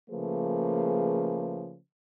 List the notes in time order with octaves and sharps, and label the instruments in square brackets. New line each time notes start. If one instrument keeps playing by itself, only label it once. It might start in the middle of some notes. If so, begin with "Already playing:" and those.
[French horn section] C#3 F3 A3 A#3 G#4 B4